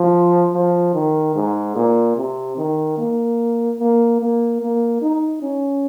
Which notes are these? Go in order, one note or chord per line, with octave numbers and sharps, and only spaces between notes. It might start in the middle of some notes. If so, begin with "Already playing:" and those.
Already playing: F3
F3
D#3
G#2
A#2
C3
D#3
A#3
A#3
A#3
A#3
D#4
C#4